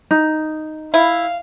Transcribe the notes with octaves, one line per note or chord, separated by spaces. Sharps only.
D#4
E4 F5